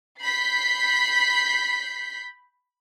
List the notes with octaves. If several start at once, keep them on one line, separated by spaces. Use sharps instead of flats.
B5 G6 B6 C7